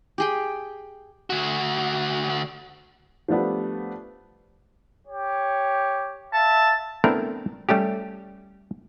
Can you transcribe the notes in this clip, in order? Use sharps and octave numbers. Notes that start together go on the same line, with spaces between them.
G4 G#4 G5
D2 F#4
F3 G3 A3 B3 D4
G4 C#5
E5 F5 A5
A3 B3 C4 D4 E4 A#4
G3 A3 C#4 G4